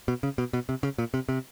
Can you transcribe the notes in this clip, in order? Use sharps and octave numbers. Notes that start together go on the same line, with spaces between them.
B2
C#3
B2
B2
C3
C#3
A#2
C3
C3